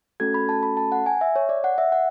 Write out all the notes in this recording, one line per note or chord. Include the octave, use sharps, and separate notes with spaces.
A3 C#4 F#4 A4 G#6
B5
A5
B5
A5
F#5
G#5
E5
C#5
D5
F#5
E5
F#5